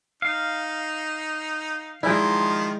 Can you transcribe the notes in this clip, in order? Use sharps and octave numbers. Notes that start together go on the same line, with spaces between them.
D#4 F5
D#3 F3 G#3 E4 D5 G#5